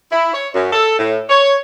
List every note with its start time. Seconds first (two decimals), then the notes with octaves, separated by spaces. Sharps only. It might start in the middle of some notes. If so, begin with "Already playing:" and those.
0.11 E4
0.33 C#5
0.54 F#2
0.73 A4
0.98 A2
1.29 C#5